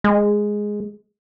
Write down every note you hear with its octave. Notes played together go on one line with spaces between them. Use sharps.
G#3